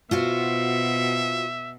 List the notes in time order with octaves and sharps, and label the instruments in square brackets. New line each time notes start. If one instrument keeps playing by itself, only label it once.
[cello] B2 [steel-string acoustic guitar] F4 F#4 C5 [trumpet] E5